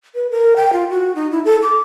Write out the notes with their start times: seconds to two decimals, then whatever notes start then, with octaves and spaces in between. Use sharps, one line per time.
0.15 B4
0.31 A#4
0.56 G5
0.73 F4
0.90 F#4
1.15 D#4
1.31 E4
1.45 A4
1.62 D6